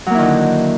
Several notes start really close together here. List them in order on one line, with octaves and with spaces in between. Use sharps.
F#3 A#3 E4 D#3 D3